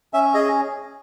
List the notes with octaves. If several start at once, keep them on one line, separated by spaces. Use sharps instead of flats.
C#4 E5
G#4 D#5